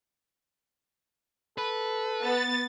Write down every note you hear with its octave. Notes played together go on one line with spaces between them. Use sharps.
A4 B4
B3 A6